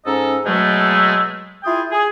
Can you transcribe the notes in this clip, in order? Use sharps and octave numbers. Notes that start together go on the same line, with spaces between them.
G#2 C#4 A4 D#5 A#5
B2 F#3 G#3 A3
E4 F4 G#4 G5 D#6
G#4